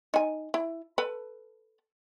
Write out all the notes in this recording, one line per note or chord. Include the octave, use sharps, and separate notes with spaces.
D#4 G#5
E4
A4 B4